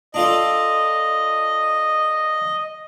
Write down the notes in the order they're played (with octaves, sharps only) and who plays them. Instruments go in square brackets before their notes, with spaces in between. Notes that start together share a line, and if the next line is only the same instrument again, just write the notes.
[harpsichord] D4 F4 A4 [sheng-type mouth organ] D#5